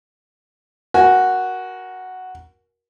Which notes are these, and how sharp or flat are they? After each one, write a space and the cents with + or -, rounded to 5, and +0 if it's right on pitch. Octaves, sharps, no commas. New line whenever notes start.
F#4 +0 A#4 +20 G#5 -5